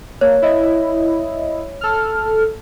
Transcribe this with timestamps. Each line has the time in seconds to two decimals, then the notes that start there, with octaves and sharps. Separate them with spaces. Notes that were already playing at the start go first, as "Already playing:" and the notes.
0.21 A#3 C#5
0.42 E4 D#5
1.81 A4 F6